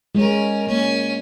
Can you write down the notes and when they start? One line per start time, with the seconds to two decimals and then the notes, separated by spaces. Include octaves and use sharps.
0.15 G#3 C#4 A#4
0.67 A#3 C#4